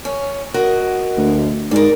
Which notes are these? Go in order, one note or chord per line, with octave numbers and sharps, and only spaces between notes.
C#4
F#4 A#4 D#5
D2
G#2 A#4 D5